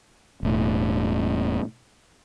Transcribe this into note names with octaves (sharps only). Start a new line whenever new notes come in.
E1 A2